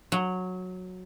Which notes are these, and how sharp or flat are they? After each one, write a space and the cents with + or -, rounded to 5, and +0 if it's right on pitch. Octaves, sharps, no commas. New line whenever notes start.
F#3 -10